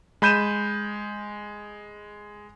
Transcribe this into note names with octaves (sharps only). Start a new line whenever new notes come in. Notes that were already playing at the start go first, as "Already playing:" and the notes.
G#3 B5 G6 D#7 E7